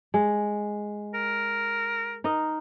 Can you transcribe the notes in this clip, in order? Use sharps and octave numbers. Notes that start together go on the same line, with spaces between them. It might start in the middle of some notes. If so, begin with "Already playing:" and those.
G#3
A#4
D#4 A#4 D#5